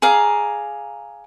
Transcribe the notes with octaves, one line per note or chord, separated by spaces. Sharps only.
G#4 D5 F5 A#5